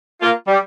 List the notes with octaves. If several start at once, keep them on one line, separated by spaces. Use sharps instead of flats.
A#3 F4
G3